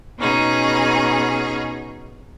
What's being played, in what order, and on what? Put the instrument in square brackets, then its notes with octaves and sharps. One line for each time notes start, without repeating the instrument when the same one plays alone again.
[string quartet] B2 C#4 D#4 G#4